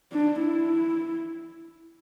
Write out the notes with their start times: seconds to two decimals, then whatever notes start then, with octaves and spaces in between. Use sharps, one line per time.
0.13 D4
0.41 E4